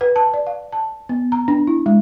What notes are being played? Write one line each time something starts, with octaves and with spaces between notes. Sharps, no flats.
B4
A5
D5
F5
A5
B3
A#5
D4
E4
G#3